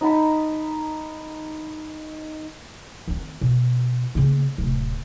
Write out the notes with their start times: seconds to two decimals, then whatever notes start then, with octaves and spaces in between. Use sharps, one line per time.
0.01 D#4 D#5 A5 B5
3.08 D#3 C4
3.41 B2
4.15 C#3 A#3
4.58 D1 C3